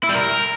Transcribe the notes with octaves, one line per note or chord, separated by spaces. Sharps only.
E4
G3
A#4